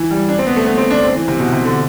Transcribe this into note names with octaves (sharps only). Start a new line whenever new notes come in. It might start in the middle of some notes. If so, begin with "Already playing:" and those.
Already playing: E3
G3
D4
C4
B3
A3
B3
C4
D4
C4
E3
C3
B2
C3
D3